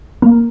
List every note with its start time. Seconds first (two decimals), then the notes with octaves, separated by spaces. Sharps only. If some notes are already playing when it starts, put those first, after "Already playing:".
0.22 A#3